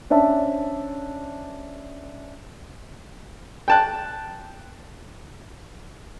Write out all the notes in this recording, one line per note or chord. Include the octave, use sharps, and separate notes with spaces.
C#4 D4 C5 E5 A5
G5 A5 F#6